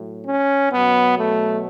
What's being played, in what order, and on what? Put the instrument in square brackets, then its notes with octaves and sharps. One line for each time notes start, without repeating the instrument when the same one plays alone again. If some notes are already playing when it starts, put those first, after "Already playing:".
Already playing: [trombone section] A2 F#3
C#4
B2 F#3 B3
A3